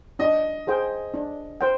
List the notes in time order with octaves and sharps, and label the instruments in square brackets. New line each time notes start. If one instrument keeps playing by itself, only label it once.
[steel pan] D4 [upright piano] D#5
[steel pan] G#4 C5 G5
D4
C5 G5